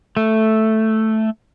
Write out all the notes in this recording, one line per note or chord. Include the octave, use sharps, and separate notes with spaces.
A3